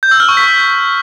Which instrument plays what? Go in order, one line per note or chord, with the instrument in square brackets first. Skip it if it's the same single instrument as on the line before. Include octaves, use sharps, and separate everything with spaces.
[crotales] G6
E6
F6
C#6
B6